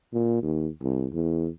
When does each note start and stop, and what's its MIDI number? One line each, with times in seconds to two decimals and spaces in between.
0.14 0.42 46
0.42 0.68 39
0.82 1.07 36
1.13 1.48 40